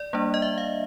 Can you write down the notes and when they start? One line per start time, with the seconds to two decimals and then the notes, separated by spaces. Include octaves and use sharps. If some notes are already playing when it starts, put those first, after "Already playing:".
Already playing: D5
0.13 G3 A#3 D4
0.34 D#5
0.42 E5
0.58 F5